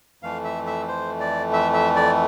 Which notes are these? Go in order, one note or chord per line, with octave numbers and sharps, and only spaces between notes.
F2 E3 A3 F5
E5
E5
C5
D5
E5
E5
D5